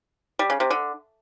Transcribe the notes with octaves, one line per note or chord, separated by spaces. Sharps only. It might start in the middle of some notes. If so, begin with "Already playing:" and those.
G3
C#3
C3
D3